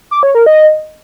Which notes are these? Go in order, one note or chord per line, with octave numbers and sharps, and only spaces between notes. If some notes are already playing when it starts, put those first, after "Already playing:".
D6
C#5
A#4
D#5